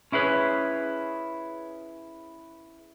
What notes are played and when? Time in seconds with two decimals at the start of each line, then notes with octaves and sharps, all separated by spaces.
0.12 C#4 E4 G#4 B4 C#5